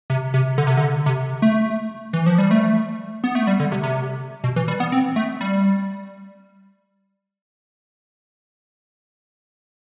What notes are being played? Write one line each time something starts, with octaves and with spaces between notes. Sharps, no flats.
C3
C3
D3
C3
D3
C3
A3
E3
F3
G3
A3
B3
A3
G3
D3
C3
C3
B2
E3
G3
B3
C4
A3
G3